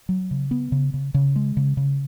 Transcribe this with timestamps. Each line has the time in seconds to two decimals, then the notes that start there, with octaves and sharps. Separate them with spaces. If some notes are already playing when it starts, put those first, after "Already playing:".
0.09 F#3
0.31 C#3
0.51 B3
0.72 C#3
0.94 C#3
1.14 C#3
1.36 G#3
1.57 C#3
1.77 C#3